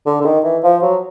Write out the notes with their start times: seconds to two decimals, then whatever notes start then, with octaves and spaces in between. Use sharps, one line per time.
0.06 D3
0.21 D3
0.25 D#3
0.44 E3
0.64 F3
0.82 F#3